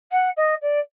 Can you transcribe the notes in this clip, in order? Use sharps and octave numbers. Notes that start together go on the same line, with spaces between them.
F#5
D#5
D5